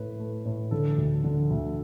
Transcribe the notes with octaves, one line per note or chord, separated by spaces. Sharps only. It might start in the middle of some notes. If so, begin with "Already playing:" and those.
Already playing: A2 A3 B4
A3
A2
D3 A4
D2
D3
D2